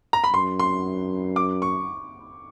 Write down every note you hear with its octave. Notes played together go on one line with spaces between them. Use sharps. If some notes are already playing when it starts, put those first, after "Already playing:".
A#5
B5
F#2 C6
C6
D6
C#6